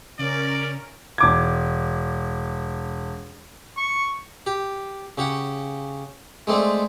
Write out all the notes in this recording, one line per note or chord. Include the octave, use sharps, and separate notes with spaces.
C#3 C#4 A#4 D5
E1 D6 G#6
C#6
G4
C#3 G4 F#5
G#3 A3 C4 D4